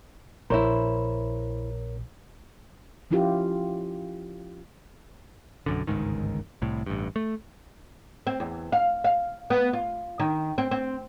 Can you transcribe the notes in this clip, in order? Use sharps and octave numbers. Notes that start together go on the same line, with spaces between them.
A#1 E4 A#4 C5 C#5
F3 C#4 E4 F4 G4
B1 F#2 D3
G1 C#2 G#2 D#3
C2 A2
A1 G2
A3
C4
E2
F5
F5
B3
F4
D#3
C4
C4